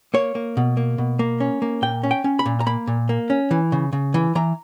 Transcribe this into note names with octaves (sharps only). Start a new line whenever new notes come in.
A#3 C#5
A#3
B2
A#3
B2
A#3
C#4
A#3
A#2 G5
C#4
G5
C#4
B5
A#2
A#5
A#3 B5
A#2
A#3
C#4
E3
C#3
C#3
E3
E3 A#5